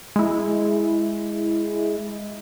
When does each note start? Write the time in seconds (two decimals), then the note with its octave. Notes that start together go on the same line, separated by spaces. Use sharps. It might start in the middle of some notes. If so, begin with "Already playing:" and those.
0.16 G#3 E4